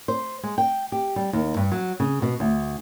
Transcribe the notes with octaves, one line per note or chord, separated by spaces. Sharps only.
C5
G#3
G5
G4
G3
D#2
G2
F#3
C#3
B2
D2